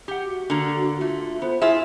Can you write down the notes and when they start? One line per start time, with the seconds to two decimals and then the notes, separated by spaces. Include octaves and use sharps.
0.08 G4 F#5
0.24 F#4
0.50 D3 A#3
1.01 A3 F4
1.42 B3 C5
1.62 E4 F4 G#4 E5